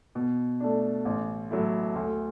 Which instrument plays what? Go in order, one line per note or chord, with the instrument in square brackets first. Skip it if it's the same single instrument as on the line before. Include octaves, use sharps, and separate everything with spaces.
[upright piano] B2
A3 D4
A1
A2 F#3 A3 E4
D2